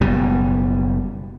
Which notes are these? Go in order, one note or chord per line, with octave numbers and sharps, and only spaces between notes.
F#1 B2 G3